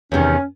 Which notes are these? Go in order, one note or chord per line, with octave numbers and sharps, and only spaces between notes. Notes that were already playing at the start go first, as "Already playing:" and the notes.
E2 C3 D#3 C#4